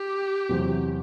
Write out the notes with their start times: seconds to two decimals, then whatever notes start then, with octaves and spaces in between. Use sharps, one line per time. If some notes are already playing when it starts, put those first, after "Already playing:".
Already playing: G4
0.49 E2 C3 F#3 C4 F#4